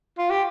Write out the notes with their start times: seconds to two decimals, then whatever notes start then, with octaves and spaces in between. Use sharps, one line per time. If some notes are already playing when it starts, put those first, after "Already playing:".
0.18 F4
0.30 G4